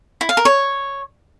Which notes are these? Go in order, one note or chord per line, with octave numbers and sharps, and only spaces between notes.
E4
F5
A#4
C#5